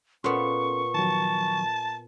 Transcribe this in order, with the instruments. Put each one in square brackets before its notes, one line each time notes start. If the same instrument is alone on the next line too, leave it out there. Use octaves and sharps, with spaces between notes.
[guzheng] A#2 B3 [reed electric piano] C#4 A4 C6 [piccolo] C#6
[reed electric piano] D#3 F3 F#3 [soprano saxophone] A5